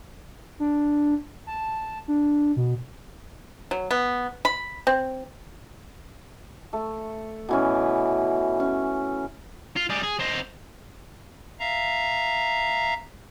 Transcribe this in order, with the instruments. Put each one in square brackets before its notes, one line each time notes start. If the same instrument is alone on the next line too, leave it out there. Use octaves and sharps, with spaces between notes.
[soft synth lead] D4
A5
D4
B2
[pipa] F#3
B3
B5
C4
[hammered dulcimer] A3
B2 E3 C#4
C#4
[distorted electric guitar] F4
G3 G#4
G#4
C4 D#4
[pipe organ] E5 F5 A#5